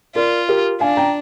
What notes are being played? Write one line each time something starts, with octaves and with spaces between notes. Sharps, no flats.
F4 A#4 D5
G4 A#4
D4 F5 G#5
G5 A#5